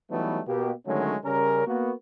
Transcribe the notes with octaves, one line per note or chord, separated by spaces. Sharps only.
E3 F#3 G3 A3 B3 D#4
B2 A#3 G4
D3 D#3 F#3 G#3 A3 C#4
C#3 G3 C#4 A#4
A#3 B3 F#4